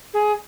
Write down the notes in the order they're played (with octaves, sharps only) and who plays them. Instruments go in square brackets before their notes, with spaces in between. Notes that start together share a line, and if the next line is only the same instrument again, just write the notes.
[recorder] G#4